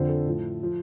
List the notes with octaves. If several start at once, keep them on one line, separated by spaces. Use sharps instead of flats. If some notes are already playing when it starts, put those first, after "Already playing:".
Already playing: F2 D3 F3 C5
A4
A2 F3
F3